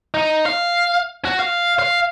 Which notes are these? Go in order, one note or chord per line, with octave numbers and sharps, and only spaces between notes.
D#4
F5
F#4
F5
F5